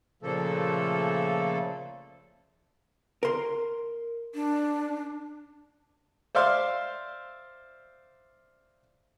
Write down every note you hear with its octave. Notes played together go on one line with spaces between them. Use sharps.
A#2 C#3 F3 A3 A#3 A4
A#4 C6
D4
C5 D5 E5 F5 C6